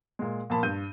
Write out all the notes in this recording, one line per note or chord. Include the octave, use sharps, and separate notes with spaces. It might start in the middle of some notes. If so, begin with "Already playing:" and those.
A#2 G#3
A#2 F3 A#3 A5 B5
G2 G6 D#7